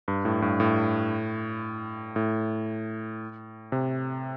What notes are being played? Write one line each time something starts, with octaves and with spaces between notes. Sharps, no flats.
G2
A2
G2
A2
A2
C3